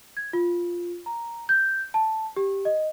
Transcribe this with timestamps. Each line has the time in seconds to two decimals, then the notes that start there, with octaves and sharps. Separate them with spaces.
0.17 G#6
0.33 F4
1.06 A#5
1.49 G6
1.94 A5
2.36 G4
2.65 D#5